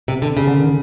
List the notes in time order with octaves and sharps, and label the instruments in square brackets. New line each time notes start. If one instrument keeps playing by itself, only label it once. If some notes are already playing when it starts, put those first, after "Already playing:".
[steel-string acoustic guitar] C3
D3
C#3
[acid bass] D3
D#3